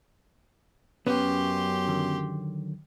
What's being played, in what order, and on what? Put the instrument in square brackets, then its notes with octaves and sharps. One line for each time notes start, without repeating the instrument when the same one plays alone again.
[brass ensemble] F#2 [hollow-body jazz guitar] B3 C#4 [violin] G4 C6
[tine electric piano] D3 D#3 F#3